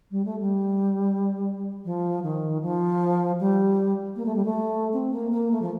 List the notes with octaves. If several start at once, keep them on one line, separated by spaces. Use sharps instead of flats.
G3
A3
G3
F3
D#3
F3
G3
A#3
A3
G3
A3
C4
A#3
A#3
A3
F3